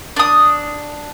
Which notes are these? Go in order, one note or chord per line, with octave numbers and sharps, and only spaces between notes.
D4 D#6